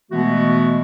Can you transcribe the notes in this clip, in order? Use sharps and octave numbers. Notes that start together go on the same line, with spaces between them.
B2 E3 G#3 A3 B3 F#4